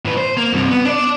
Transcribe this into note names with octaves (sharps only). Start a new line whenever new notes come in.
A2 B4
C5
A#3
G2 C3
B3
D4 D5